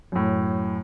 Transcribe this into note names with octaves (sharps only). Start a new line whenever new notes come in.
F#2 A2